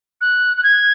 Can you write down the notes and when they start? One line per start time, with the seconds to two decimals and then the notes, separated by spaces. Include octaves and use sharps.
0.21 F#6
0.57 F#6
0.64 G#6